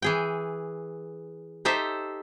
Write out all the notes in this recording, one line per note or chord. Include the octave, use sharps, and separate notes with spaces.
E3 G#4 G5
D#4 G4 A4 C5 E5